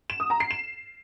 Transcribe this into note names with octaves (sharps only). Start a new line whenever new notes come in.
E7
D#6
A#5
C7
E7